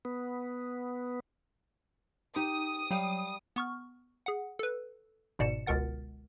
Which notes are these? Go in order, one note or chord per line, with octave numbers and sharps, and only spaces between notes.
B3
D#4 G4 D#6
F#3 G3 F5 G5
B3 C#6 F6
G#4 F#5
A4 B4
G1 G#2 B2 D5 C#7 E7
G1 C#2 B2 A#4 F#5 A6